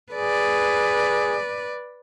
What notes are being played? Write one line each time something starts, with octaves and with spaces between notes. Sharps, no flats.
G#4 B4 D5